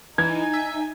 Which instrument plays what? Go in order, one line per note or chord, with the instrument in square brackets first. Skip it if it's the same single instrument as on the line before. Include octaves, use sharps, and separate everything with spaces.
[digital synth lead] E3 [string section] D#4 G#5 [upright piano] G#6
[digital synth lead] E5